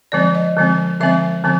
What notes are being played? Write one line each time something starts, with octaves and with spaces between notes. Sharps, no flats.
D3 F3 G#3 C4 D5
D#5
D3 F3 G#3 C4
D3 F3 G#3 C4 E5
D3 F3 C4